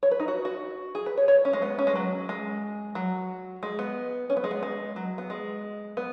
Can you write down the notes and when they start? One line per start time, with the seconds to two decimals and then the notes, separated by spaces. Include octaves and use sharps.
0.03 C#5
0.11 B4
0.20 D#4
0.28 F#4
0.45 F#4
0.95 G#4
1.06 B4
1.17 C#5
1.28 C#5
1.45 C#4
1.53 G#3
1.62 B3
1.79 C#4
1.87 G#3
1.95 F#3
2.29 G#3
2.95 F#3
3.63 G#3
3.79 B3
4.30 C#4
4.37 B3
4.44 G#3
4.51 B3
4.63 G#3
4.96 F#3
5.18 B3
5.30 G#3
5.97 B3